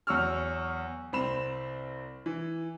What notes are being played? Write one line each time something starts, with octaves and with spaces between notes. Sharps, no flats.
E2 F#3 C#6 E6 F6
C2 C4 B5 E7
E3